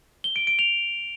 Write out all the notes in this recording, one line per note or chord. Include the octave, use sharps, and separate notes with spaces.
G7
D7
D7
F7